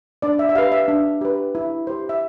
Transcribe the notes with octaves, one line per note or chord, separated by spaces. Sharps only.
D4 D5
E5
E5
G4 B4 F5
E5
D4
G4 B4
E4
G4 C5
E5